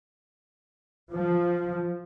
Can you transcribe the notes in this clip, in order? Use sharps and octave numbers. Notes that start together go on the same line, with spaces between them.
F3